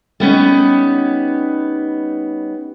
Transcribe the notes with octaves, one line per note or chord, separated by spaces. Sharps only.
G3 B3 C#4 D#4